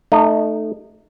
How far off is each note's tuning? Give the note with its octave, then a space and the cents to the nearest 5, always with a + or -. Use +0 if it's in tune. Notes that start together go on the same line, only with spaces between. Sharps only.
A3 +0 D#4 -30